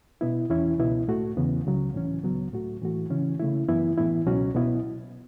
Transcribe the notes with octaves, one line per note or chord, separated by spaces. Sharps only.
B2 B3 E4
E2 E3 C#4 E4
C#2 B2 B3 E4
A2 A3 F#4
E2 C#3 E3 B3
C#2 C#3 F#3
A2 E3 C#4
C#2 C#3 F#3 B3
A2 A3 F#4
A2 E3 A3 F#4
C#3 E3 C#4
C#3 A3 E4
F#2 E3 B3 E4
A2 E3 B3 E4
C#2 B2 F#3 C#4 F#4
B2 B3 E4